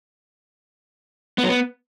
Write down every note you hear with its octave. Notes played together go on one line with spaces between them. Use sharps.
B3
F#3
B3